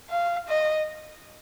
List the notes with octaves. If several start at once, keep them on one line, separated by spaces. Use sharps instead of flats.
F5
D#5